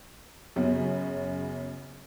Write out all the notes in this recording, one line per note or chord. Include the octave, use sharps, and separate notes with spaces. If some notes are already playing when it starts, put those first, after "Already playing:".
F#2 C#3 B3 C#4